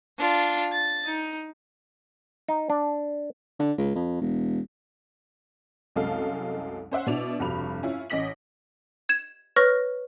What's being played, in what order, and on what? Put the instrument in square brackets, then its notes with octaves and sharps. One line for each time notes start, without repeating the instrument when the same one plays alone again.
[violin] D4 F4
A6
D#4
[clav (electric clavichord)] D#4
D4
[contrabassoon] D3
C#2
F2
E1
[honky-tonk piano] C2 F#2 G#3 A4 F5
C#4 C5 E5 F#5
B2 D4 E4 F7
F1 G2 F#4 B5 F7
C#4 E4 F4
A1 C#4 D#5 A#6 B6 F#7
[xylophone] G#6 E7
B4 C#5 C#6 F6 A#6